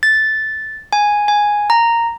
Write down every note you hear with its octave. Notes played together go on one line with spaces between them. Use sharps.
A6
G#5
G#5
A#5